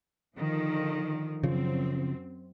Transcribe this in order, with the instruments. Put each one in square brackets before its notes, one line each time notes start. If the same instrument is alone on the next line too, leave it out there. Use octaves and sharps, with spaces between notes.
[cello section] D3 D#3 F3
[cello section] F#2 C4 [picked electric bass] C#3 F3